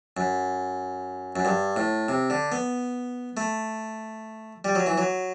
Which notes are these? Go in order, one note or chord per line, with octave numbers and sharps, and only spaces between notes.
F#2
F#2
G2
A2
C3
D3
B3
A3
G3
F#3
E3
F#3